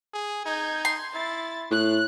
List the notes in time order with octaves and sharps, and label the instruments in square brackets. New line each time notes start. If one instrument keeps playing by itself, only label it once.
[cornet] G#4
[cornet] D#4 [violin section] G6 G#6
[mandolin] C6
[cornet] E4 [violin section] A6
[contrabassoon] A2 [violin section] F#6